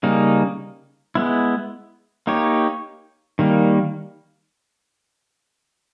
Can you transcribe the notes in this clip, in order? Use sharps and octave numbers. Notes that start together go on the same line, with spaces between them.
C#3 G3 A#3 D#4
G#3 B3 E4
A#3 D#4 G4 C#5
D#3 G3 A#3